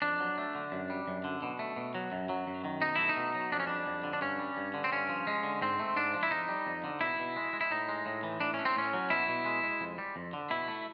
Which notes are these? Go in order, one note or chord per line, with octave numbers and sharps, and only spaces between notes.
F2 D4
F#3
A3
D3
F#2
G3
F#2
D3
B2
A3
B2
F#3
F#2
F#3
F#2
D#3
B2 D#4
A3 E4
D#4
B2
F#3
F2 D4
C#4
G3 D4
F2
D3
D4
G2 C#4
G3
G2
D3
C4
G2 C#4
F3
G#3
D3
G#2 C4
A3
G#2 D4
F3
E4
F2 D#4
G3
F2
D3
B2 E4
B2
G#3
G#3
E4
A2 D#4
G#3
A2
E3
A2 D4
A3 C#4
C4
A2 C#4
F#3
B2 E4
B2
G#3
G#3
F2
G3
F2
D3
B2 E4
A3